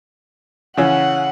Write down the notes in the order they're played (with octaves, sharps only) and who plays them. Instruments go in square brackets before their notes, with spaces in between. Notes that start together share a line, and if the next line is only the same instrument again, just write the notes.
[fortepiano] C#3 E3 C#4 [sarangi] F#5